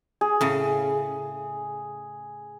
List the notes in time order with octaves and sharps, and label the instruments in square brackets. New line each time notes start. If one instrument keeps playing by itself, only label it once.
[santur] G#4
[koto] A2 C#3